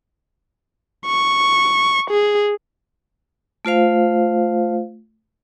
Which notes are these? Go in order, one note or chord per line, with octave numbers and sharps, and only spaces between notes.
C#6
G#4
A3 F4 C5 F5